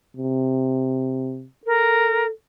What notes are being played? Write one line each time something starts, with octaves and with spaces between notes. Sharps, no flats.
C3
A4 A#4